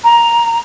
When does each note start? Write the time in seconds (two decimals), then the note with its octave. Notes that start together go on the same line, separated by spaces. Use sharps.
0.04 A#5